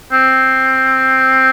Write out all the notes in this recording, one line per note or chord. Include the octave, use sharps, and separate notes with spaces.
C4